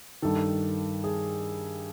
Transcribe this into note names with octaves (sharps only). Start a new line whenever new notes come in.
G2 D#3 A4
G#4